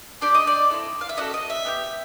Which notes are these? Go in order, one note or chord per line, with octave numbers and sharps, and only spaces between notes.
D4 G4 D5
D#5
D5
C4 E4 A4
F5
E5
C#4 F#4 A4 D#5
D#5
E5
B3 E4 G4